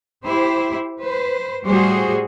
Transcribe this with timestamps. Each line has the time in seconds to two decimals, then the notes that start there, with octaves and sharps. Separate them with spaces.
0.24 E4 G4 C5
0.99 B4 C5
1.63 A2 G3 F#4 G#4 C5